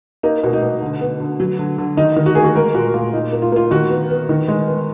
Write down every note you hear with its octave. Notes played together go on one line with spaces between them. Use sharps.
A#3 D#4
B2
D#4
B2
D3
B3
D3
F#3
D3
D3
D#3 D#4
D#3
F#4
A#3 G#4
F#4
G#3 A#4
A#2 F#4
A#2 F4
A#2 D#4
A#3
F4
A#3 F4
D#3 F#4
B3
B3
D#3
G#3
B3